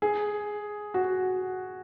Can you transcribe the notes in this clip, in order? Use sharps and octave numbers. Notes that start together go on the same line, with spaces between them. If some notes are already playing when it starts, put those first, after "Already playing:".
G#4
F#4